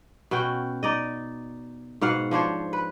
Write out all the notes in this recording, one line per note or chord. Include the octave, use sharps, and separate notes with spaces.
B2 C#4 F#4 G5
D#4 D5 D#5
G#2 B2 F5 F#5
F3 D4 C5 C#5
B4